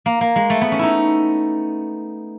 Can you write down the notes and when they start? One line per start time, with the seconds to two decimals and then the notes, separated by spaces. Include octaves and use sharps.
0.06 A#3
0.21 A#3
0.36 G#3
0.50 A3
0.61 B3
0.72 C#4
0.79 D#4 E4